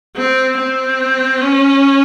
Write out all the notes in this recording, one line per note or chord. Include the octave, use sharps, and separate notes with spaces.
C4
C4
C#4